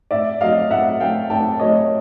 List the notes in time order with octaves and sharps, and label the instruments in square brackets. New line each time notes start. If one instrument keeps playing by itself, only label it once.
[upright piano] A2 D5 E5
F#3 A3 D#5 F5
A2 E5 F#5
F#3 A3 F5 G5
A2 G5 A5
F#3 A3 C#5 D#5